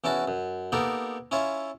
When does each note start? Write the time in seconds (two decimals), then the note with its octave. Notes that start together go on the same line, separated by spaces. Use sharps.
0.04 E2 C#4 E4 F#4 A5
0.28 F#2
0.72 A#3 B3 D#4 G4 A4 A#4
1.31 C#4 E4 F4 C#5 E5